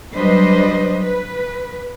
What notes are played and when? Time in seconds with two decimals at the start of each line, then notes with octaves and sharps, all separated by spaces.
0.14 F#3 G3 D4 B4 C5 D#5
1.02 B4